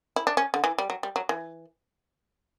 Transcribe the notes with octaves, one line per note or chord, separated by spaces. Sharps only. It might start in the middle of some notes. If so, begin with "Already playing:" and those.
E4
D4
C#4
D3
E3
G3
F#3
G3
F#3
E3